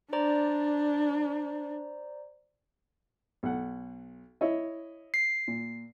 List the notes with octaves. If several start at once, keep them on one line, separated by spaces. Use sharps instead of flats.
D4 C5 D5 A#5
B1 F#5
E4 C#5 D#5
C7
A#2